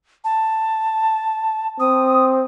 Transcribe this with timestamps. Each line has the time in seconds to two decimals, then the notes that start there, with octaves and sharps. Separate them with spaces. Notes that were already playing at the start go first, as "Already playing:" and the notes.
0.24 A5
1.80 C4 D#6